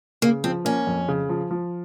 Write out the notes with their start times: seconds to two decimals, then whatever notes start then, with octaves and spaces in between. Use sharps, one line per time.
0.22 C#3 A#3
0.44 F3 C4
0.65 A#3 C#4
0.87 F2
1.09 C#3
1.29 F3
1.51 F3